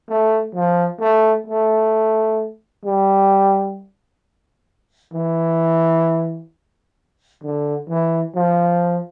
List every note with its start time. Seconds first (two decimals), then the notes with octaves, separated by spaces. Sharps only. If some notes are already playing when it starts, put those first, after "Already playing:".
0.09 A3
0.54 F3
1.00 A3
1.47 A3
2.84 G3
5.14 E3
7.43 D3
7.89 E3
8.35 F3